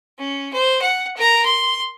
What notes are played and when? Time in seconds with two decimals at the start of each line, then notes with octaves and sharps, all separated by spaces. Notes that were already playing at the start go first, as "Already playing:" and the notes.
0.19 C#4
0.53 C5
0.82 F#5
1.17 A#4 A#5
1.45 C6